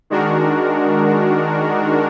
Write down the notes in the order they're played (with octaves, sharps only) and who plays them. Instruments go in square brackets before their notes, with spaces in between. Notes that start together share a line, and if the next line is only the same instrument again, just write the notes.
[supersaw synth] D#3 G#3 D4 F#4 A#4